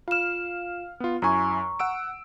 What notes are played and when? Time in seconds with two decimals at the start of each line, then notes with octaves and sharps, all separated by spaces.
0.08 F4 F5 F6 E7
1.00 B3 F4
1.22 F#2 E4 G#5 A#5 C#6
1.79 F#5 E6 D7